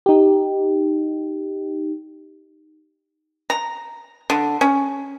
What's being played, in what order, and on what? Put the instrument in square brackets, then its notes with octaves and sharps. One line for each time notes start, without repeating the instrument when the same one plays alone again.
[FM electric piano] D#4 G4
[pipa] A#5
D3
C#4